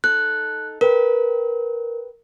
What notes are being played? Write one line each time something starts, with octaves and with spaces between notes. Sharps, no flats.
D#4 A4 F#6
A#4 B4 G5